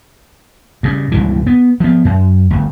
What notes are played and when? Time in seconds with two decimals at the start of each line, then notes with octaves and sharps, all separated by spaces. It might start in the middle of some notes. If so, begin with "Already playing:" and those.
0.83 G2 C#3
1.12 C#2 G2 E3
1.47 B3
1.80 F3 B3
2.05 F#2
2.51 G1 D2